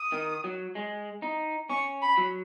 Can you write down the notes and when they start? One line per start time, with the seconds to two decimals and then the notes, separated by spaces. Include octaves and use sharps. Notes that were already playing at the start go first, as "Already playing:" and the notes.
Already playing: D#6
0.12 D#3
0.44 F#3
0.75 G#3
1.22 D#4
1.69 C#4 C#6
2.02 B5
2.18 F#3